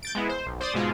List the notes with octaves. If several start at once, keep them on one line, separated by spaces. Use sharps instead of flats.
G6 A6 D7
G#3 B3 E4
C5
B1
C5 D5 D#6 A6
G#2 B2 G#3 F4